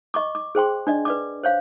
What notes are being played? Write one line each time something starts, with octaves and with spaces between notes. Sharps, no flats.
D#5 C#6 D6
D6
G#4 C5 G5 C6
D4 D5 D#5
B4 D5 D6
C5 C#5 F5